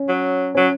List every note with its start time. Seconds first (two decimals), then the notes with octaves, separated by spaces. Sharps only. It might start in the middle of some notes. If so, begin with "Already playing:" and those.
Already playing: C#4
0.08 F#3
0.55 F#3 C#4